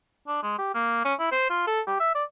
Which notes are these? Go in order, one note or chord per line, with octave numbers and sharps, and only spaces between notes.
D4
G#3
G4
A#3
C#4
E4
C5
F4
A4
G4
E5
D5